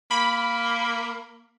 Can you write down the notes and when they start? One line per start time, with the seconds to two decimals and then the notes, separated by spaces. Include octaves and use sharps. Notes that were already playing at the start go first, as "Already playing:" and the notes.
0.11 A#3 B5